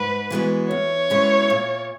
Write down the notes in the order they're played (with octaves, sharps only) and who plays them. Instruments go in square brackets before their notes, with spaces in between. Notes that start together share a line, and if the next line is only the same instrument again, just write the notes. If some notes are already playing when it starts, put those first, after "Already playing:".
Already playing: [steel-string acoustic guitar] G#2 [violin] B4
[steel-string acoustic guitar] E3 G#3 B3 F#4
[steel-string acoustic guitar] E2 [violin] C#5
[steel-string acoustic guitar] B2 G#3 C#4 E4
A#2